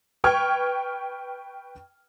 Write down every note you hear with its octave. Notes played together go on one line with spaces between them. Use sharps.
B4 G5 C#6 F6 G#6